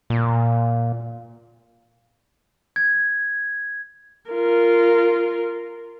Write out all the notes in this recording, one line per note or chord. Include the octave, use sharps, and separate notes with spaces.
A#2
G#6
F4 A#4